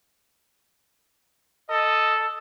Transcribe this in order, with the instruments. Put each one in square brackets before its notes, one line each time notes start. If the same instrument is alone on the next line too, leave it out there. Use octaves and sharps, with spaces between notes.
[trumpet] A4 [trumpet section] D#5